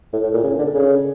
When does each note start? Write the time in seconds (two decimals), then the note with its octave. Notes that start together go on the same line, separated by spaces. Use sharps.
0.13 A2
0.23 A2
0.33 A#2
0.43 C#3
0.58 D3
0.74 C#3